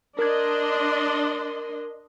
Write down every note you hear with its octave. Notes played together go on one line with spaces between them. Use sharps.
D4 A#4 D#5 C6 G#6